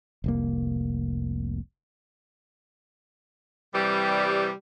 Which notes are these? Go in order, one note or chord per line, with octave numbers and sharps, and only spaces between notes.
F1 C2 A#3
C3 E3 G3